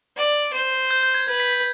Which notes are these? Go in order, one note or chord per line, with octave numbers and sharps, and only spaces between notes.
D5
C5
G6
G6
G#6
B4 G#6
B6
B6